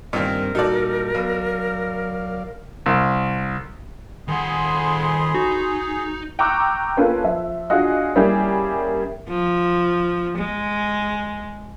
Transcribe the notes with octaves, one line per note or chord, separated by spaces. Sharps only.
G2 A#2 D#3 G3 C4 A#4
A#2 G3 D#4 F#4 A4 D5
B2 F#3 D5 F5
C2
F2 D#3 G#4 F#5 B5 C6
D#4 F#4
G5 A#5 C#6 D6 E6 F#6
A#3 C#4 F4 A4 B4
F3 E5
D4 F4 F#4 G#4 D#5
G3 A#3 C#4 E4 G4 G#4
F3
G#3